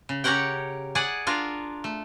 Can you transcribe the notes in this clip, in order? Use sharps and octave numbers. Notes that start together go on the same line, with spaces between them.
C#3
C#4 G4 A#4 C#5 F#5 G5
G#4 D5 F#5 G#5
D4 F4 A#4
A3